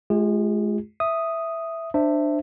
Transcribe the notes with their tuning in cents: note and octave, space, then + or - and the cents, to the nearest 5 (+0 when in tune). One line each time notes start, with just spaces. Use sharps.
G#3 +35 F4 +0 G#4 -35
E5 +0 D#6 +0
D4 +20 C5 +0 E5 +0